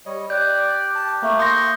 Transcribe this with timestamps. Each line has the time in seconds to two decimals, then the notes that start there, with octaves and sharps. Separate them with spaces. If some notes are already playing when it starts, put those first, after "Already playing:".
0.06 G3 C#5 D#5
0.30 G4 D5 F#6 G6
0.95 A5
1.22 A3 A#3
1.39 C6 C#6 D#6 G6 A#6